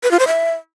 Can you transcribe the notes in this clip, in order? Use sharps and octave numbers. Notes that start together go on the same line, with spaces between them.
B4
F4
C5
E5